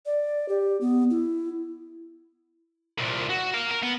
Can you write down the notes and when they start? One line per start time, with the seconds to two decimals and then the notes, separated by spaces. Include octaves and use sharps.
0.06 D5
0.49 G4
0.81 B3
1.10 E4
2.98 C2 A#2
3.30 F#4
3.54 A#4 F5
3.71 A#4
3.83 B3